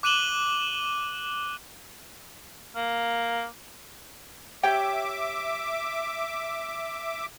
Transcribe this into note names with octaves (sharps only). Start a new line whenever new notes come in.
D6 F#6 D#7 E7 F#7 G7
A#3
G4 C#5 E5 G5 D6